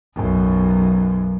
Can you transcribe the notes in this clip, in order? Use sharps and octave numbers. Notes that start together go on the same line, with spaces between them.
B1 F#2